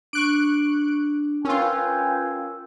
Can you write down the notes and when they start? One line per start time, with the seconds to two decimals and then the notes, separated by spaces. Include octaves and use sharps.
0.13 D4 C#6 F#6 D7
1.45 C#4 F4 A#4 B4 G5 G#5 E6